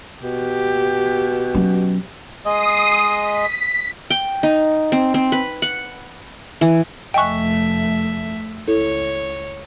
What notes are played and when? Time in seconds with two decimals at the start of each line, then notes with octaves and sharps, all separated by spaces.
0.23 B2 G4
1.55 F#3 C#4
2.45 G#3 D#5 D#6 C7 D#7
3.23 B6
4.10 G5
4.43 D#4
4.92 C4
5.14 C4
5.32 B4
5.62 F#5
6.61 E3
7.14 F1 A3 D#5 E5 G5 G#5 C#6 F#6
8.68 C#2 E4 A4 C#5